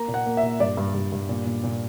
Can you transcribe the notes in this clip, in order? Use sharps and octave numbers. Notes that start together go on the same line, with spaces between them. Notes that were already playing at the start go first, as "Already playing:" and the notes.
Already playing: A#3 A#5
A#2
F#5
A#3
E5
A#2
G2 D5
G2
G2
G2
A#2
A#2
A#2